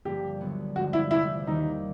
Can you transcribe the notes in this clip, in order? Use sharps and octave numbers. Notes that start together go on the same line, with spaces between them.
G2 D3 F3 A#3 G4
D2 D3 F#3 B3
G2 D3 F3 G#3 F#4
E4
E2 C3 F3 A3 C4 E4
D#2 D#3 G3 A#3 D#4